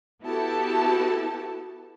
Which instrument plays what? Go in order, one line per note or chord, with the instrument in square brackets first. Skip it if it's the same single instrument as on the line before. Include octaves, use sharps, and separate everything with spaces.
[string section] B3 E4 F#4 G4 A4 A5